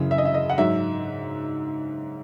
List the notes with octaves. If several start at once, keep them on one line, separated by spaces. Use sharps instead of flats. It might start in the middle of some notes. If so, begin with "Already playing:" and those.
Already playing: F#2 C#3 E3
E5
D#5
E5
D#5
F#5
G#2 F#3 E5